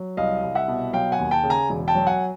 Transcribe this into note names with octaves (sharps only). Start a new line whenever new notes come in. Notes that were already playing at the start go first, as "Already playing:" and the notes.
Already playing: F#3
C2 D#5 F5
C2
E5 F#5
B2
F#3 F5 G5
F#5 G#5
D#2
G5 A5
C#3
G#5 A#5
E1
G5 A5
F#3
F#5 G#5